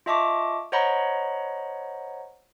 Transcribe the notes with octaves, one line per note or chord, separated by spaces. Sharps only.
F4 D#5 E5 A5 C#6 D6
C5 C#5 D#5 F#5 A#5 B5